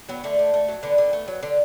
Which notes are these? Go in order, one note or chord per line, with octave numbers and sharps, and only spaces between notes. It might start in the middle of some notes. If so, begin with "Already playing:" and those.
F#3 B3
D3 A3
D3
A3
F#3
D3 B3
D3
A3
F#3
D3